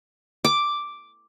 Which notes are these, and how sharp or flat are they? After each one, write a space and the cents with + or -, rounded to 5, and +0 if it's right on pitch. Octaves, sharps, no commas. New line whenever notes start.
D6 +0